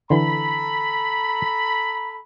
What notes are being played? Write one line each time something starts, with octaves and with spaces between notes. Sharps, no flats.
D3 E3 A4 A#5 B5